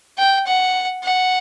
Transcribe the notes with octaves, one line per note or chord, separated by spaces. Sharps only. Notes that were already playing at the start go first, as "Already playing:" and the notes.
G5
F#5
F#5